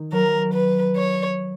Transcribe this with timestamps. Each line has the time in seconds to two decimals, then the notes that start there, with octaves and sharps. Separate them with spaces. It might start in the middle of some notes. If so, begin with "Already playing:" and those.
Already playing: D#3
0.12 F#3 A#4
0.54 B4
0.96 C#5